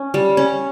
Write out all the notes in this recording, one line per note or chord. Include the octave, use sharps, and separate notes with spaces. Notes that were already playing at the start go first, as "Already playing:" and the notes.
Already playing: C#4
G3
C#4